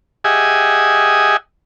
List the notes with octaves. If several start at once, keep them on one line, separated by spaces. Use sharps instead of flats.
G4 G#4 D#5 E5 F#5 G#5